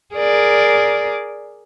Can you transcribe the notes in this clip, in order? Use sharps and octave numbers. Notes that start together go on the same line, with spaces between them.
G#4 A#4 D5